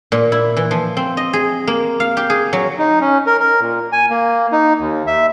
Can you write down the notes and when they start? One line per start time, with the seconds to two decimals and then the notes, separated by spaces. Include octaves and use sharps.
0.12 A#2
0.32 E4
0.57 E3
0.71 F3
0.97 C4
1.17 D#5
1.33 G#4
1.67 A#3
2.00 F5
2.17 G4
2.30 G#4
2.53 F#3
2.78 D#4
3.00 C#4
3.26 A#4
3.40 A#4
3.60 A#2
3.92 G#5
4.10 A#3
4.52 D#4
4.79 D#2
5.07 E5